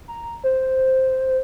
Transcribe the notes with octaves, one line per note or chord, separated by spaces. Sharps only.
A#5
C5